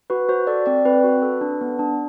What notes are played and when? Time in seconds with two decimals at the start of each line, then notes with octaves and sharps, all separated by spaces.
0.10 F#4 B4
0.29 F#4 C5
0.47 A4 D5
0.66 C4 D5
0.85 C4 B4
1.04 F#4
1.22 A4
1.41 D4
1.61 B3
1.79 D4